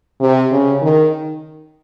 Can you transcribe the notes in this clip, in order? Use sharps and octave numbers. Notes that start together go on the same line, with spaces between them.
C3
C#3
D#3